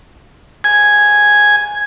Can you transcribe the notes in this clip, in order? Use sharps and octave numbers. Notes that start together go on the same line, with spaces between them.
G#5